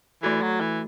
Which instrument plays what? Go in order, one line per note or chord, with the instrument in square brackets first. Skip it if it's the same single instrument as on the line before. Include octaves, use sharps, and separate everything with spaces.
[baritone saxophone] E3 [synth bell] A3 F#4 A4
[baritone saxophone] F#3
E3